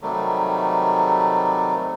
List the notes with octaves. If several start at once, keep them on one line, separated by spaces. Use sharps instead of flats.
C3 D#3 F#3 G3 A3